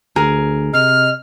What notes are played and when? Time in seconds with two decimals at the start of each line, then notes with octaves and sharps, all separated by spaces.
0.16 D2 G#4 A#4
0.73 C3 D#5 F6